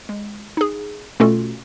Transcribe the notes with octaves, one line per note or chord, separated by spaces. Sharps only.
G#3
D#4 G#4
B2 A3 C#4 F4 F#4 A4